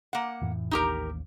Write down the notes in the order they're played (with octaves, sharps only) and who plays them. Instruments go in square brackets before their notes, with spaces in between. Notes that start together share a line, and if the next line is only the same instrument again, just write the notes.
[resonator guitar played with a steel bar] A#3 F#5
[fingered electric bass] F2 A2 E3
[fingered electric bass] A1 D#2 [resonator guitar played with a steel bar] D#4 G4 A#4